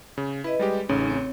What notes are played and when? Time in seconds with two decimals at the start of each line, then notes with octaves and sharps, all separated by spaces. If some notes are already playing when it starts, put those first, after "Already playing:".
0.18 C#3
0.44 E4 B4 D#5
0.59 G3 G#3 G4
0.89 A1 C#3 C#4 D#4
1.08 C4 C#5